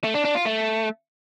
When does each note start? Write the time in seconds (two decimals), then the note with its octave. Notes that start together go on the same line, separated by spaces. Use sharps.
0.04 A3
0.14 D4
0.25 D4
0.35 F4
0.45 A3